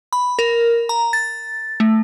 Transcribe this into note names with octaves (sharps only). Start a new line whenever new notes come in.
B5
A#4
A#5
A6
A3